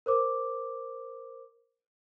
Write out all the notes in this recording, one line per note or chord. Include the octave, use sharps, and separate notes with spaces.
A#4 C5 D6